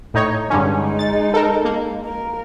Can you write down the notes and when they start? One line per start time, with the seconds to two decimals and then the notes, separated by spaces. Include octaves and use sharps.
0.14 A2 D#4 C#5
0.50 G2 D3 G#3 C#4 D#4
0.99 A6
1.34 A4 A#4
1.65 A#3
2.06 A#4